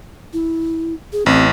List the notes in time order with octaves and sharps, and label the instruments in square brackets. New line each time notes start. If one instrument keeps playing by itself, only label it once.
[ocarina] E4
G#4
[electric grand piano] A1 [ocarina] C4